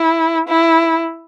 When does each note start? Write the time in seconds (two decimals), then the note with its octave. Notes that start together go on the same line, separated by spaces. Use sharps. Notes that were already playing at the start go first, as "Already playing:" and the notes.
Already playing: E4
0.49 E4